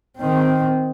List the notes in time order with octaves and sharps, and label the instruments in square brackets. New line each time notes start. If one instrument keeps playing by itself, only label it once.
[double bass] D#3 C4